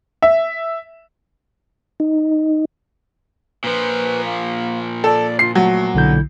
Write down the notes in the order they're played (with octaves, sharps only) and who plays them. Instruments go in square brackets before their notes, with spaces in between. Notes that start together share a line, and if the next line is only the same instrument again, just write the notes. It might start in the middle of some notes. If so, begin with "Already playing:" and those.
[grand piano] E5
[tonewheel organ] D#4
[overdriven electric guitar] A#2 F3 [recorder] B4
[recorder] A#3
[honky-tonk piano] A4 [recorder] D5
[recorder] F4 [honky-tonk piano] C7
[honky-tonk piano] F#3 [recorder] A3
[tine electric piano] B1 D3 G6 [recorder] E4